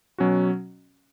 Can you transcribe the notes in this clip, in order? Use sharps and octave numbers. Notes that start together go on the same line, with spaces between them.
B2 F#3 C#4 F#4